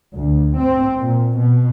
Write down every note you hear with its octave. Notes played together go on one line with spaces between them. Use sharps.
D2
C4
A#2
B2